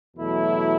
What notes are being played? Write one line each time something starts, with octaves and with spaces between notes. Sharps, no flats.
E2 B2 F#3 A3 E4